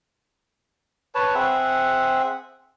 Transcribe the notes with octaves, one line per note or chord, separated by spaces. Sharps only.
B4 C#5 A5
C4 G#4 E5 F#5